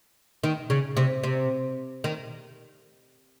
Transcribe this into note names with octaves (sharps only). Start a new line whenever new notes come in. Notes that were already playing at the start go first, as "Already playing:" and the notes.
D#3
C#3
C3
C3
D#3